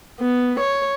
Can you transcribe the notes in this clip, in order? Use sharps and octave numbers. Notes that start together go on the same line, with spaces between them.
B3
C#5